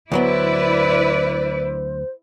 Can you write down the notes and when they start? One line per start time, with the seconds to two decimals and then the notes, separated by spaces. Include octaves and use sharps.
0.12 D2 F#3 B3 E4 B4 C5 D5